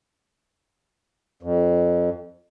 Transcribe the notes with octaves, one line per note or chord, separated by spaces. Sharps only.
F2